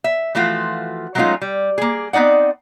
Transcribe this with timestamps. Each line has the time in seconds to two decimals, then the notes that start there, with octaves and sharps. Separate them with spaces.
0.04 E5
0.35 E3 F3 A3 F4 F#4
1.15 F#3 G#3 A3 C#4 D#4 F4
1.41 G3
1.78 A#3 G#4
2.13 B3 C4 D#4 D5 F#5